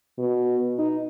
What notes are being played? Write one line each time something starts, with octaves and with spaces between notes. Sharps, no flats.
B2
D#4